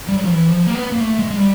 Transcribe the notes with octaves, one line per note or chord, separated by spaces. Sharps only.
G3
F#3
F3
E3
F3
A#3
B3
A#3
A3
G#3
G#3
G3